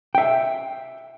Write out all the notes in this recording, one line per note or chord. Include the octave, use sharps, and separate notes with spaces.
E5 G5